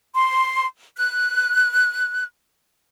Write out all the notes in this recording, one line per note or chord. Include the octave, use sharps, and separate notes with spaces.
C6
F#6